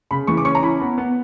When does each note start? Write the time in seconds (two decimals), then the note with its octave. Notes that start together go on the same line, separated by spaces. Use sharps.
0.11 C#3 B5
0.27 E3 C#6
0.37 D6
0.45 C#4 C#6
0.55 A#5
0.62 E4 B5
0.81 B3
0.98 B3